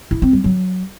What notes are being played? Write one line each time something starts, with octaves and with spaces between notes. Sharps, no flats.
E4
C4
G3
F#3